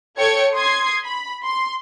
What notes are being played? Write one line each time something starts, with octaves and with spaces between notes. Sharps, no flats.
A4 C#5 G5 G#6 C#7 D7
C6 D#6 G#6 C7
B5
C6